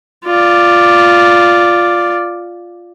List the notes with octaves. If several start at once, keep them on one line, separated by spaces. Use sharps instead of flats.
F4 D5